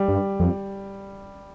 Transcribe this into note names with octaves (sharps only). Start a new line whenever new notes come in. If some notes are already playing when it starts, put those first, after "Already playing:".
Already playing: G3
G2
F2